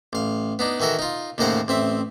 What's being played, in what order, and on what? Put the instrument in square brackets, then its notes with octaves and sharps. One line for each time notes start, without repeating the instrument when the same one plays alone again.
[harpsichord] A1 F5
B3 D4 D#4
D#3 E3 F#4 A4 A#4
D#4 F4
D#2 A2 C#3 A#4 C5 F#5
A1 C4 E5